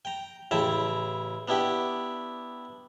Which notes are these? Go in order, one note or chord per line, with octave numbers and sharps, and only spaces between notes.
G5 A#5
A1 C#3 E4 G5 A5 A#5
B3 D4 E4 G4 G5